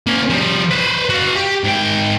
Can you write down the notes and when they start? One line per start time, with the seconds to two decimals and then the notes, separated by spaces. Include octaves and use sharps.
0.07 A#3 C#4
0.30 F3 G3
0.71 B4 C5
1.09 F#4 F5
1.36 G4
1.64 G#2 G5